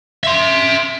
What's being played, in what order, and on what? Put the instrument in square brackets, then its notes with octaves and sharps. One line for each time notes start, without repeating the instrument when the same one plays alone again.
[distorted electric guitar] E5 C6